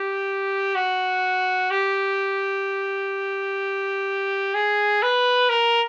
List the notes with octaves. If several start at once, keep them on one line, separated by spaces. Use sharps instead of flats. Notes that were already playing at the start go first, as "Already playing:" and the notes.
Already playing: G4
F#4
G4
G#4
B4
A#4